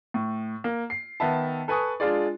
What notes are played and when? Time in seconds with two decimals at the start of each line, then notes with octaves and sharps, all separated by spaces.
0.14 A2
0.64 A#3
0.90 C7
1.20 D#3 B3 E5 A5
1.68 A4 B4 G#5 C#6 D#6
2.00 G#3 D4 F4 G#4 D5